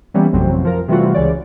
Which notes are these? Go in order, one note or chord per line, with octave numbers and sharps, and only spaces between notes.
E3 G3 A#3 B3 C#4
A1 F2 C3 F#3 C4
F3 A#4
C3 E3 G3 A3 F4 F#4
C#2 C#3 E3 C#5 D5